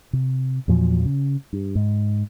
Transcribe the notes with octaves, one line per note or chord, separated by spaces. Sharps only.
C3
E2 A#2 F3 F#3
C#3
G2
G#2